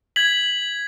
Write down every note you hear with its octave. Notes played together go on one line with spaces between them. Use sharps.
G#6 B6 F#7